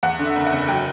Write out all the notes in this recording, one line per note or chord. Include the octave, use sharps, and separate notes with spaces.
E2 F#5
D3
E5
F#1
F#5
F#1
F#3 G5